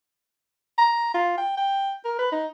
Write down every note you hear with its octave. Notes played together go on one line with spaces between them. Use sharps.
A#5
F4
G5
G5
A#4
B4
D#4